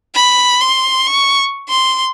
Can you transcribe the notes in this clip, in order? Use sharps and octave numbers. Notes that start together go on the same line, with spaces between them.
B5
C6
C#6
C6